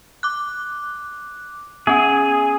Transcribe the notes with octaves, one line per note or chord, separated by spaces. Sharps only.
D6 F#6
B3 C#4 G#4